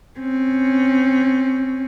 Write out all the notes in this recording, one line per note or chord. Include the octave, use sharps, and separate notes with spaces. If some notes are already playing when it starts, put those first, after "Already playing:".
C4 C#4